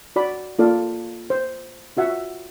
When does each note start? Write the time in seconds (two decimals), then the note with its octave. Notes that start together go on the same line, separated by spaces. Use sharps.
0.16 F#4 D5 B5
0.59 A#3 F4 A4 D5 F5
1.30 C5
1.97 F4 F#4 E5 F#5